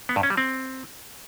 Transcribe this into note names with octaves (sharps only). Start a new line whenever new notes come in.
B3
G2
C#4
G3
C4